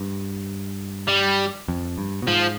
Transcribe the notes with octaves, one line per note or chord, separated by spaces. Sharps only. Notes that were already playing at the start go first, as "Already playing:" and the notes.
Already playing: G2
G3
F2
G2
B2
G#2 F3